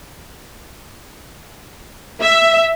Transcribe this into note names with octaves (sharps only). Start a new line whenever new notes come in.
E5